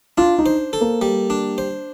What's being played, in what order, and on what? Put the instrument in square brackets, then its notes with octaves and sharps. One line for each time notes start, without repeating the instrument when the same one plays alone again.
[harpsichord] D4 [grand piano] F4
[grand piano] D#4
[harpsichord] C5
A4
[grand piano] A#3
[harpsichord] G3
D4
C5